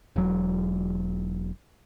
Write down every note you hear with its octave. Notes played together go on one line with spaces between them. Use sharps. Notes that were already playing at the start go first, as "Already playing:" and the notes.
E1 F#3